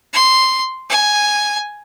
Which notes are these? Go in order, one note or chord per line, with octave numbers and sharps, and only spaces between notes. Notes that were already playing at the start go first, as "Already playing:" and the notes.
C6
G#5